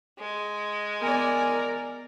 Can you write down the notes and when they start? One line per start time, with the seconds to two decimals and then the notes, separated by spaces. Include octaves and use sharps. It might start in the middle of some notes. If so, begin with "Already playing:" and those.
0.19 G#3
1.02 B3 A#4 D5 G#5